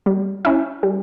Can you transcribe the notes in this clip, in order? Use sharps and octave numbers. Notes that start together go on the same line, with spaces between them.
G3
C#4 E4
G3